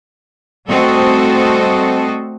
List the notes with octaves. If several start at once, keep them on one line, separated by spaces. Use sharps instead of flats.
G3 A3 C4 F#4 A4 D#5